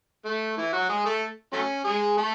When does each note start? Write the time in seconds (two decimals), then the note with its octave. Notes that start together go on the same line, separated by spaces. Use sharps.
0.25 A3
0.57 E3 E4
0.73 F#3 F#4
0.89 G#3 G#4
1.05 A3 A4
1.53 F#3 A3 C#4
1.85 G#3 G#4
2.17 A3 A4